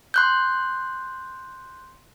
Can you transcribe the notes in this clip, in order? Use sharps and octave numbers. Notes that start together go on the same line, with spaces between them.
C6 F#6 G6